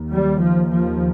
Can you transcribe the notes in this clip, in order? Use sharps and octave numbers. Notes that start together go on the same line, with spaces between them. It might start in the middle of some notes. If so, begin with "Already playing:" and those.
Already playing: D#2
G3
F3
F3